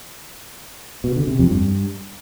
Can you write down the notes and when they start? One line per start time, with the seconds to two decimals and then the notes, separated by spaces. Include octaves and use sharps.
1.04 B2
1.16 D3
1.27 C3
1.39 F2
1.51 G2